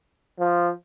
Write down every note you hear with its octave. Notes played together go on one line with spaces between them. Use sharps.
F3